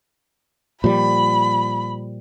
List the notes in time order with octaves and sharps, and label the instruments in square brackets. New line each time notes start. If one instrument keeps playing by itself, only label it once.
[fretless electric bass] A#2 F3 G3 [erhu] B5